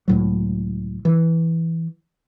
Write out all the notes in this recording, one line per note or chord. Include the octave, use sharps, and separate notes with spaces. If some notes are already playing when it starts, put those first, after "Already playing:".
C#2 A2 F#3
E3